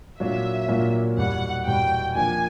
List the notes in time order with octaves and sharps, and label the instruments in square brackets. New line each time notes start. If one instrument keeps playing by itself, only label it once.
[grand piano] A#2 F#3 A#3 D4 F4 [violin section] E5
[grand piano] A#2 F#3 A#3 D4 F4
[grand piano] E2 B2 G3 [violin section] F#5
[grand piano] E2 B2 G3 [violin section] G5
[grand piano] F3 A#3 D4 [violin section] G#5